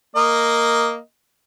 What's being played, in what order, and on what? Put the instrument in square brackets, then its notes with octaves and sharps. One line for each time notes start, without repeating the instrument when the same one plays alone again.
[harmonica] A#3 D#5